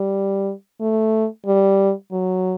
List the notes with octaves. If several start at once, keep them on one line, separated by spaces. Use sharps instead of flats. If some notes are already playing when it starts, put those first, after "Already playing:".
Already playing: G3
A3
G3
F#3